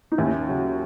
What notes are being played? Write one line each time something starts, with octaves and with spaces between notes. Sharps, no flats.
D#4
D#2 C#4 E4
C#3 F#3